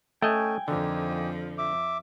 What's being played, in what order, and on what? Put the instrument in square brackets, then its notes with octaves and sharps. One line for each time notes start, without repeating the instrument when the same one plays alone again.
[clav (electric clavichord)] A3 D#5 [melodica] C#4 [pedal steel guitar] G5 G#5
[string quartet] F2 F3 [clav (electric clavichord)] D3 [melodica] A#3 D#4
[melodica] E5 D6